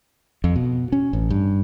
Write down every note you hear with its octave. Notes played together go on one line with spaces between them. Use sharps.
F2
B2
C#4
A1
G2